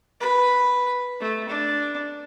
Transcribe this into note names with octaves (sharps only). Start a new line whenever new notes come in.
B4
A3
D4